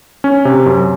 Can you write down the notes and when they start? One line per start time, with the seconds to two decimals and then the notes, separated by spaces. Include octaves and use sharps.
0.24 C#4
0.45 C3
0.66 F#2